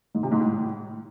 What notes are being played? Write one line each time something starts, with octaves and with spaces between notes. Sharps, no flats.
G#2
C3
G#2
A2